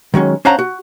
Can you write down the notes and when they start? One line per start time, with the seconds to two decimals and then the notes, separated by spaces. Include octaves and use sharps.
0.14 D#3 F#3 G#3 C#4
0.45 C#4 C5 F5 F#5 A5 A#5
0.59 F#4